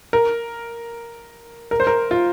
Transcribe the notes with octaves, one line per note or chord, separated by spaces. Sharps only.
A#4
A#4
C5
A#4
F4